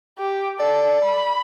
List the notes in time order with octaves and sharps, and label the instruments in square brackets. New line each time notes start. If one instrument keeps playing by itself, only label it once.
[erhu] G4
[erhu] A4 [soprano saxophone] D5
[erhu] B5